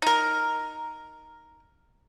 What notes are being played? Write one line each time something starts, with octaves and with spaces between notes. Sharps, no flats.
D#4 A#4